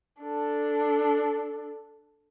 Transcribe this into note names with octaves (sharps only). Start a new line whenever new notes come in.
D4 A4